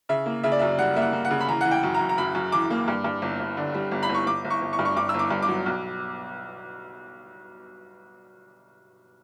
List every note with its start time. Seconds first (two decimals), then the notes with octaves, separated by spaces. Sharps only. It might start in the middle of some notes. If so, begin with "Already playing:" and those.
0.09 C#3 E5
0.26 A#3
0.43 C#3 E5
0.52 D5
0.59 F#2 E5
0.78 G3 F#5
0.96 A#3 E5
1.02 F#5
1.13 A#3
1.25 F#5
1.31 C#3
1.41 B5
1.48 E3 A#5
1.61 E3 F#5
1.71 G5
1.83 F#2
1.94 A#5
2.00 F#2
2.09 A#5
2.18 F#2 B5
2.35 F#2
2.52 E3 D6
2.71 A#3
2.88 G2
3.04 G2
3.22 G1
3.40 G1
3.57 D3
3.74 G3
3.92 G1
4.03 B5
4.09 G1
4.14 C#6
4.27 G1 D6
4.45 G1
4.50 C#6
4.62 G1
4.73 C#6
4.79 G2
4.85 C#6
4.96 G2 D6
5.09 E6
5.14 G1 D6
5.30 G2
5.42 D6
5.48 F#3
5.66 B1